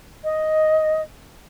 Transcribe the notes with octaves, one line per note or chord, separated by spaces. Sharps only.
D#5